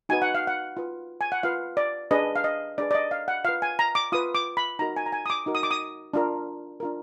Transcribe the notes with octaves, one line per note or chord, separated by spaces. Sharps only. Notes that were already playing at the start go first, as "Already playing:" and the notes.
D#4 F#4 B4 G#5
F#5
F5
F#5
F4 B4
G#5
F#5
F4 B4 F5
D5
D4 G#4 B4 D#5
F5
D#5
D4 G#4 B4 D5
D5
D#5
F5
F#5
F4 B4 F5
G#5
A#5
D6
F4 B4 D#6
D6
B5
D#4 F#4 A#4 A#5
G#5
A#5
G#5
D#6
D6
D#4 F#4 A#4
D#6
D6
D#6
D4 F4 A#4
D4 F4 A#4